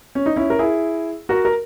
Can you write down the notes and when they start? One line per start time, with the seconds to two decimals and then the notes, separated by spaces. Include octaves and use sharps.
0.15 C#4
0.26 D#4
0.36 C#4 E4
0.50 A#4
0.59 E4 G#4
1.29 F#4 A#4
1.45 A#4